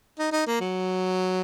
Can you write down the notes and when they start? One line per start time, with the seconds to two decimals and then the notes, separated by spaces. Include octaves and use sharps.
0.19 D#4
0.32 D#4
0.47 A#3
0.60 F#3